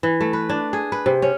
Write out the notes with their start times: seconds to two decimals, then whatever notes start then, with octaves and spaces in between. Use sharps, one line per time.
0.03 E3
0.21 A3
0.33 B4
0.49 D4
0.73 G#4
0.92 B4
1.06 C3
1.22 C#4